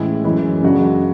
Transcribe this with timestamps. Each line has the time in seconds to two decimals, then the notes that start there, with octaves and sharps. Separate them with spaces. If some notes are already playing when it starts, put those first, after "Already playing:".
Already playing: A2 E3 G#3 C#4 E4
0.24 F#2 E3 G#3 C#4 E4
0.63 F#2 C#3 G#3 D4 F#4